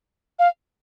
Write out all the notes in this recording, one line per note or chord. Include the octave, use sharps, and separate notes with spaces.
F5